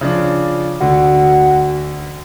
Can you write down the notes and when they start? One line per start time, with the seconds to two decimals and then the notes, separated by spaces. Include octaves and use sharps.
0.01 C#3 F3 D4
0.81 D2 D3 F#4